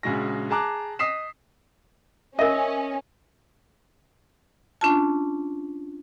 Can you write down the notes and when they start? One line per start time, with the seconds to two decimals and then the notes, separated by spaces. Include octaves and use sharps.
0.03 A#1 C#3 G#3 F#4 A#6
0.50 G#4 A5 A#5 D6 F#6
0.99 D#5 D#6 B6 C7 E7
2.39 C#4 A#4 D#5 E5
4.81 C#4 D4 F4 A5